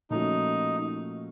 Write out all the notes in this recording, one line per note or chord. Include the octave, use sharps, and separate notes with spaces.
A#2 F3 A3 C#4 D#4 F#4